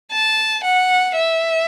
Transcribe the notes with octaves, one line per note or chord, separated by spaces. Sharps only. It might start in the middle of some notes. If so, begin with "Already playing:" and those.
A5
F#5
E5